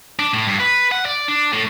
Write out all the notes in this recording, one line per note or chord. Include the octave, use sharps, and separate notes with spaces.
D4
A2
G2
B4
F#5
D5
D4
A2